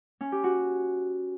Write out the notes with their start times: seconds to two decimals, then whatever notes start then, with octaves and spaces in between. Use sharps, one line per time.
0.21 C#4
0.32 G4
0.44 F#4